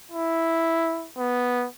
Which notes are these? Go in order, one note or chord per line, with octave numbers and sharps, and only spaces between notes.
E4
B3